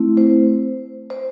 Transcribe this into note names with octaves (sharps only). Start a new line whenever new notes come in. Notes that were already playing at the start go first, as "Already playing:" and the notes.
Already playing: A3 C4 E4
C5
C5